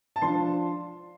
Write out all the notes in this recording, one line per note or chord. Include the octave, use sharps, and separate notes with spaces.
A5
F3 D4 F4 C6